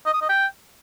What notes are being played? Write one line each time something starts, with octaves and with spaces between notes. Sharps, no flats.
D#5
D#6
D#5
G5